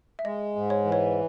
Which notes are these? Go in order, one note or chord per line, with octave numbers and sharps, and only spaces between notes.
E5
G#3 D#5
G#2
C#5
E3
C#5